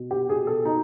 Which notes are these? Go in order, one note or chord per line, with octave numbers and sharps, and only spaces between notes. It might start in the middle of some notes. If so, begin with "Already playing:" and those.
Already playing: B2
G4
B2 G#4
A4
B2 D#4